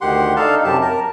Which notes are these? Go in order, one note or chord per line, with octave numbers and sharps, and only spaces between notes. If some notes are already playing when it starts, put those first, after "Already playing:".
D2 D#3 G4 F#5 C6
D4 D#4 A4 F5 A5
F#2 C3 G4 A5
A#4 A5